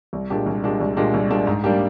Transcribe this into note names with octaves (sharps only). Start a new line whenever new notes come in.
C2
A#2 G#3 D4 G4
C2
A#2 G#3 D4 G4
C2
A#2 G#3 D4 G4
C2
A#2 G#3 D4 G4
G#2
G3 A#3 D4 G4